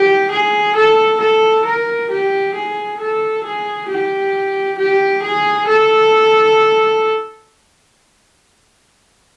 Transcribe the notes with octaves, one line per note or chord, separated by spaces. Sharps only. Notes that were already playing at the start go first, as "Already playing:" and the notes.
Already playing: G4
G#4
A4
A4
A#4
G4
G#4
A4
G#4
G4
G4
G#4
A4